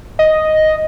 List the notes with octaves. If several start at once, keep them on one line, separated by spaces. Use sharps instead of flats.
D#5